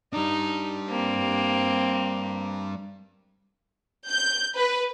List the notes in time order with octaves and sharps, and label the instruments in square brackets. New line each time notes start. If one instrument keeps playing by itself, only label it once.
[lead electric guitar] G3 D4 [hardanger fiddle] D#4
[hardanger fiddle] A#3 C4
[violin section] G6
B4